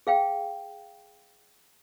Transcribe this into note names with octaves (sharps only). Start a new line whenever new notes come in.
G#4 F5 G5